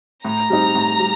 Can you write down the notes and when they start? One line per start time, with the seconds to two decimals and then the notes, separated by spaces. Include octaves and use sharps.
0.24 A2 A#5
0.50 G3 C4 D#4
0.75 A2
0.99 G3